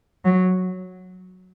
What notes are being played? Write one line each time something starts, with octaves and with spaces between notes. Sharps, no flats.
F#3